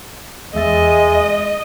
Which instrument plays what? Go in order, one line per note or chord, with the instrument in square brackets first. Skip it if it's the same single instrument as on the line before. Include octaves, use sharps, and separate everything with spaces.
[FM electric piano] E2 E5 A6 [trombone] G#3 [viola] D#5